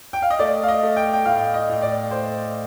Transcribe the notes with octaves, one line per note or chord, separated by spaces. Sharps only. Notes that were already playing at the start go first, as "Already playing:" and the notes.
G5
F5
D#5
A3 D5
F5
D#5
A3
G5
G5
A2 F5
D#5
A2
D5
A3 C5